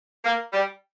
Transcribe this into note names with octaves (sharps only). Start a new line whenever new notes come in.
A#3
G3